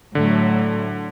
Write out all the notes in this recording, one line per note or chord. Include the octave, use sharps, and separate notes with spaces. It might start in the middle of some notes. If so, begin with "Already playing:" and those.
A2 D3 F#3 A3